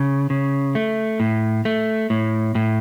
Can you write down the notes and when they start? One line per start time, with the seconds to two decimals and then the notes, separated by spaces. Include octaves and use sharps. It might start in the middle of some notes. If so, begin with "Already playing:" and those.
Already playing: C#3
0.30 C#3
0.75 A3
1.20 A2
1.65 A3
2.10 A2
2.55 A2